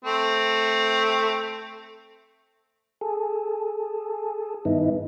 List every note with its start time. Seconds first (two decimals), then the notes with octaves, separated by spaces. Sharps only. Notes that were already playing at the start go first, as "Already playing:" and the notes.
0.05 A3 C4
3.01 G#4 A4
4.65 G2 D#3 B3 D#4 E4